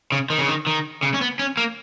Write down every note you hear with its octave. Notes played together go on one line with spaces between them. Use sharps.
C#3
D#3
C#3
D#3
D#3
C#3
C#4
B3
C#4
A#3